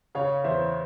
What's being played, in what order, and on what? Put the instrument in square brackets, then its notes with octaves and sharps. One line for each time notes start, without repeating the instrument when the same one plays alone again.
[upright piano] C#3 [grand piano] C#5 F5
[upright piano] E2 [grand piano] C5 E5